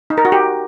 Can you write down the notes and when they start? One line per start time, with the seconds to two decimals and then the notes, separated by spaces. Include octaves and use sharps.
0.10 D#4
0.18 A#4
0.25 F#4
0.32 G4